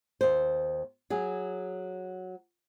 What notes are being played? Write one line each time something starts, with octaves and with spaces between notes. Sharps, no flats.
D#2 C5
F#3 G#4